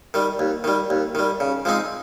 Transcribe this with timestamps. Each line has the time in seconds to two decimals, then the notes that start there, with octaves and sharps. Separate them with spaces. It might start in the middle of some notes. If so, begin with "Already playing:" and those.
0.14 D#3 G3
0.39 D#2
0.64 D#3 G3
0.90 D#2
1.15 D#3 G3
1.40 C#3
1.65 F3 G#3 C4 D#4